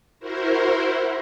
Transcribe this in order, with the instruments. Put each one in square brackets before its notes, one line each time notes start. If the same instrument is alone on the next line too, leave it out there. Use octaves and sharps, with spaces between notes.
[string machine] E4 F#4 A#4 C5